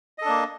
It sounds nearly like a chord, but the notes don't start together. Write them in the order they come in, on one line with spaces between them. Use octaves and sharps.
D#5 A4 D4 A#3